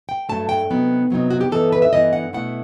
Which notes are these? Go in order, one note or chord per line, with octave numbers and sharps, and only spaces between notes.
G5
G2 F#3 A3 A5
G5
C3 F#3 B3 D#4
C3 F#3 B3 D#4
F#4
G4
G2 E3 B3 D#4 A4
B4
E5
G2 E3 B3 D#4 D#5
F#5
B2 A3 E4 F#5